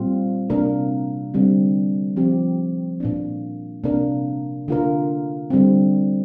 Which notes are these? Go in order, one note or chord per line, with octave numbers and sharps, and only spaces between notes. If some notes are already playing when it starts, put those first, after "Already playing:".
Already playing: A#2 G3 C4 F4
C3 A#3 D4 A#4
D3 G3 C4
F3 C4 G4
A#2 A#3 D4
C3 A#3 D4 A#4
D3 A#3 F4 A#4
D3 G3 C4